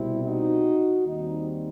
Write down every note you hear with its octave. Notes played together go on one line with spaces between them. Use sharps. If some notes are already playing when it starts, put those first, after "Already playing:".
Already playing: C2 B2 G3 C4 E4
D#4 F#4
D#2 D#3 G3 C4 D#4